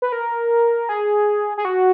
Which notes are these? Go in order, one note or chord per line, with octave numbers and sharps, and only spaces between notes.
B4
A#4
G#4
G#4
F#4